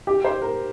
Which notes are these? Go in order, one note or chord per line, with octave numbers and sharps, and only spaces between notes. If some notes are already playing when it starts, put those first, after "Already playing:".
G4
C5
A#4